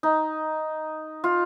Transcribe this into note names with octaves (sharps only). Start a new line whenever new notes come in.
D#4
F4